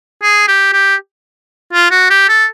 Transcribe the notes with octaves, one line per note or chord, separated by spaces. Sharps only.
G#4
G4
G4
F4
F#4
G4
A4